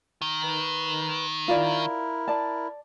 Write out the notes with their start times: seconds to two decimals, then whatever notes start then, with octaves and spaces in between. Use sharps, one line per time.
0.22 D#3
0.43 B4
1.48 E4 F4 A#4 D5
2.28 D5 A5